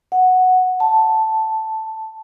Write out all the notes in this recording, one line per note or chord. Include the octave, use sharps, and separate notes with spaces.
F#5
A5